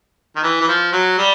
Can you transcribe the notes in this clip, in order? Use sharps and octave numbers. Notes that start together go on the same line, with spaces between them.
D#3
E3
E3
F3
F#3
G3